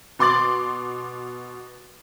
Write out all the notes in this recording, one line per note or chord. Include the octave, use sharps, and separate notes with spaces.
B2 C6 D6 A6 F#7